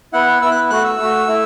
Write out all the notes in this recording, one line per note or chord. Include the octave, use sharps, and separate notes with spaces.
B3 E4 F#5
B3 E4 E6
F#6
A3 F#4 F#6
E6
A3 F#4
A3 E4